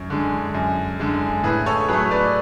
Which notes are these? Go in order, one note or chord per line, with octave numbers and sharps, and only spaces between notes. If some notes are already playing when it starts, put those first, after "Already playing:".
Already playing: F#2 C#5
D3 G#3
F#2
D3 G#3
A2 G#4 B4
A4 C#5
F#3 A3 G#4 B4
B4 D5